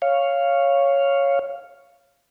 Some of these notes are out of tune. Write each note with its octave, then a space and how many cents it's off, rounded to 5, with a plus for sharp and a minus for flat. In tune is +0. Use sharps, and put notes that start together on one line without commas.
C#5 +0 F5 -5